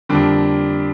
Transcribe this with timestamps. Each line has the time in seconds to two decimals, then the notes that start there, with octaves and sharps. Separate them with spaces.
0.09 F2 D3 G3 A#3 D4